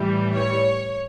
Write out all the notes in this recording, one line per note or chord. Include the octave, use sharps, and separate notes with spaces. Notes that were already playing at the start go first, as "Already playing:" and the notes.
Already playing: A2 E3 G3
C#5